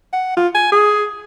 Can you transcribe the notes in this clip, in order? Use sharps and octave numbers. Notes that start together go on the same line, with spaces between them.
F#5
F4
G#5
G#4